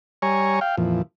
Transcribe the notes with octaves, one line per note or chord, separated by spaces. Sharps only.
G3 C#5 G#5 A#5 C#6
F5 G5
F2 A#2 E3 F3